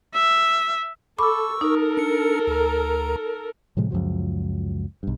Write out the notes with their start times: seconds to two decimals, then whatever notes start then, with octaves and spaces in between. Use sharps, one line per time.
0.14 E5
1.18 A4 B5 C#6 D6 E6
1.61 D#4 A4 A#4
1.97 D4 C#7
2.47 D2 A#5
3.77 A2 C3 F3 G#3
3.91 C#2 F#2 F3 F#3
5.03 B1 G2